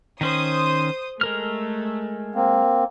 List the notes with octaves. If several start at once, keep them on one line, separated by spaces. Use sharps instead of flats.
D#3 C#4 C5 D#6
G#3 A3 A#4 F6
A#3 C4